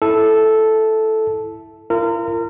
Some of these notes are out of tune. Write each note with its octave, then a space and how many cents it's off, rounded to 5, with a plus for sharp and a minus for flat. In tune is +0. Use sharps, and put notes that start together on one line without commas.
E4 +0 A4 -10
F4 -40 A#4 -30